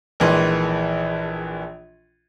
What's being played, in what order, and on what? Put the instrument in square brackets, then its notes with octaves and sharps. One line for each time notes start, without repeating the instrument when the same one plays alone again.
[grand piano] A#1 D#3 E3 G#3 C6